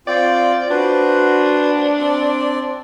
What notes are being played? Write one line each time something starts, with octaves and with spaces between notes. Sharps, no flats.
C4 F4 D5 G5
D4 F#4 B4 C5
C4 D5